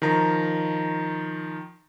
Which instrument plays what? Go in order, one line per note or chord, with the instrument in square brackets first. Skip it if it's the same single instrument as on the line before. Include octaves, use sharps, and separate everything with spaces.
[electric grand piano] D#3 F3 A#5